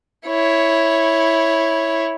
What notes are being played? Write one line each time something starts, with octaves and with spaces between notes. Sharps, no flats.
E4 C#5